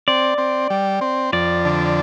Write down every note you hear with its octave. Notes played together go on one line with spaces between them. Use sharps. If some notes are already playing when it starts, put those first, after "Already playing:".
C4 D5
C4
G3
C4
F2 D5
D3